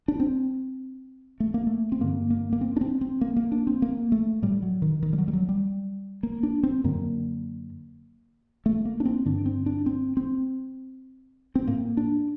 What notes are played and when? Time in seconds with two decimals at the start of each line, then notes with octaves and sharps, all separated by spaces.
0.08 D4
0.20 C4
1.40 A3
1.54 A#3
1.67 A3
1.92 C4
2.00 G2 D3 A#3
2.30 A#3
2.53 A#3
2.61 C4
2.76 D4
2.81 C4
3.01 C4
3.21 A#3
3.36 A#3
3.52 D4
3.67 C4
3.82 A#3
4.12 A3
4.42 A2 G3
4.62 F#3
4.82 D#3
5.03 D#3
5.13 G3
5.18 F#3
5.28 G3
5.33 F#3
5.49 G3
6.23 A#3
6.43 D4
6.63 C4
6.84 F#2 D3 A#3
8.66 A3
8.85 A#3
9.00 D4
9.05 C4
9.26 G2 D3 D4
9.46 C4
9.66 D4
9.86 C4
10.17 C4
11.55 C4
11.67 A2 A#3
11.97 D4